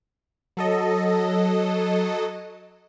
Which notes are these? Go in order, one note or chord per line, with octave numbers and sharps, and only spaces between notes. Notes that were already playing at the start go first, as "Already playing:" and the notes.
F#3 A4 D#5